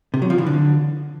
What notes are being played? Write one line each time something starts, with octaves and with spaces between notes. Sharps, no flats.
C3
F#3
F3
E3
D3